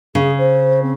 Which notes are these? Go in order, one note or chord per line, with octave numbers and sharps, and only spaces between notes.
C#3 G#4
C5
C4